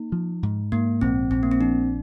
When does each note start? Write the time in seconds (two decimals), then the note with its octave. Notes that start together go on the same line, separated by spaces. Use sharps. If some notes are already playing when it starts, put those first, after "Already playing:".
Already playing: A#3 D#4
0.12 F3
0.43 G#2
0.72 G#2 A#3
1.01 A#1 C4
1.31 A#1 C4
1.43 A#3
1.51 C4
1.61 F3 D4